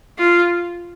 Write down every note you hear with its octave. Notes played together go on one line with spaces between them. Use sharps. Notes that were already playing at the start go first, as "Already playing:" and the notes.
F4